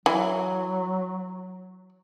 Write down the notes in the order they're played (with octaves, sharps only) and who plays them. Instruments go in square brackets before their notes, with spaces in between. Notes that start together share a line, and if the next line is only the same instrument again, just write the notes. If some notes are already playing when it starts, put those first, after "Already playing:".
[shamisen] E3 [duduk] F#3